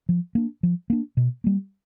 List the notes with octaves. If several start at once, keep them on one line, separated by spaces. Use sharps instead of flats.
F3
A#3 D4
F3
A#3 D4
B2
G3 A#3